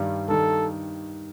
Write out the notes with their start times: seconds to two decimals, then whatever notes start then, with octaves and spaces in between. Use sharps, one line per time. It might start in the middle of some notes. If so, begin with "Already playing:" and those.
Already playing: G2 D#3 G3
0.28 G2 D#3 G3 A4